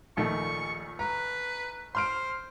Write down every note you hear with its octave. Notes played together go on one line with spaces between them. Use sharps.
A#1 D#2 D#3 A3 C#6
B4 A#5
C5 C6 F6 D7